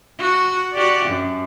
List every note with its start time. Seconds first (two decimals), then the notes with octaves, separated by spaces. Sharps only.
0.18 F#4
0.73 F#4 G4 D5
1.06 F#2